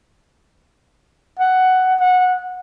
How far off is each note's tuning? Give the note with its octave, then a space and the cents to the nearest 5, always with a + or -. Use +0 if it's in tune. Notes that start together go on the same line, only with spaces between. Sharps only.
F#5 +10
F#5 -15